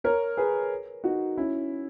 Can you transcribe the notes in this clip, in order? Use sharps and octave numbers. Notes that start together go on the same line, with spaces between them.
A#4 C#5
G#4 B4
D#4 F#4
C#4 E4